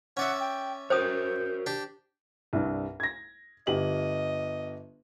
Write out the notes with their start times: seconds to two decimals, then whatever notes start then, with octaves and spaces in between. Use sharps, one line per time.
0.17 C#4 D5 E5 F#5
0.40 G5
0.90 F#4 A#4 C5 C#5 G5 D#6 G6
1.66 D4 G4
2.53 C2 G2
3.00 G#6 A#6
3.67 G1 G4 D#5 F#7